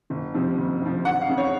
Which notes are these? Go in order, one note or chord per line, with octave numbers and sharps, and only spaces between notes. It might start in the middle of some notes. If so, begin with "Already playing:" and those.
F#1
F2 C3 F3
F#1
F2 C3 F3
F#1 F#5
F5
F2 C#3
C#5